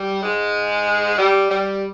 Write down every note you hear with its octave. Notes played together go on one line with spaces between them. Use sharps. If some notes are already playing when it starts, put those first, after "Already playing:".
Already playing: G3
G#2 G#3
G3
G3